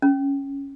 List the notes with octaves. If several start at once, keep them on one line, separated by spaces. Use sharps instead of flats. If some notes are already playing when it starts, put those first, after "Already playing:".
C#4